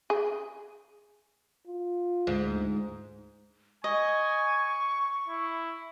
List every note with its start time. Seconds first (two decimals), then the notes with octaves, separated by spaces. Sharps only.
0.10 G#4
1.67 F4
2.27 D2 G#2
3.84 D#5 G#5 C#6
5.29 E4